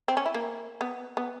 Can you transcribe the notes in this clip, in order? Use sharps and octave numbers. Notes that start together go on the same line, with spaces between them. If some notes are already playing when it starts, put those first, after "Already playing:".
C4
C#4
E4
A#3
B3
B3